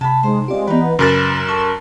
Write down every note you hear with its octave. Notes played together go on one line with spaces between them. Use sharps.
C3 A5 B5
G#3 D#4 C5
G#3 C4 F4 G4 D5
E3 B3 D#4 B4
F#2 C#3 A#4 B4 A6 E7
A4 C#6